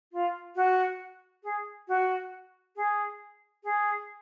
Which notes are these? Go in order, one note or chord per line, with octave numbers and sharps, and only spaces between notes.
F4
F#4
G#4
F#4
G#4
G#4